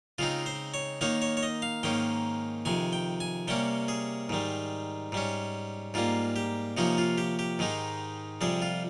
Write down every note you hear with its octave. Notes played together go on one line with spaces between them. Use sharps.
C#3 G#3 C4 D#4 F4
C5
C#5
D#3 A#3 D#4 C#5
C#5
C#5
D#5
F5
G#2 D#3 A#3 C#4 G5
F2 C3 D#3 G#5
G5
G#5
C3 G3 A#3 C#4 G5
G#4
G#2 D#3 G3
G#2 G3 C#4
G#2 G3 A#3 F4
G4
C3 F3 A#3 C#4 D#4
F4
G4
G4
G#2 D#3 G#3 D#4
F2 C3 G3 G#4
F4